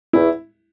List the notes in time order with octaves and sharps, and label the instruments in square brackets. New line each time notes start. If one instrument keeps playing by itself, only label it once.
[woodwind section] E2 E3 [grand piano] E4